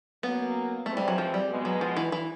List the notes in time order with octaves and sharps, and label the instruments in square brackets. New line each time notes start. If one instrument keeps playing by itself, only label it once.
[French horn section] F#3 A#3 C#4 [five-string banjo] B3
[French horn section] C3 E3 G#3 C4 [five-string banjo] A3
[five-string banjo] G3
F#3
F3
G3
[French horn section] B2 G#3 B3
[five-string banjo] F#3
F3
E3
E3